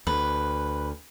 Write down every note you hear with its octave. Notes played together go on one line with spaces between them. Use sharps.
D2 B4